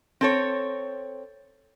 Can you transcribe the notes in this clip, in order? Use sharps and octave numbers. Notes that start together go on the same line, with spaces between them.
C4 A4 C#5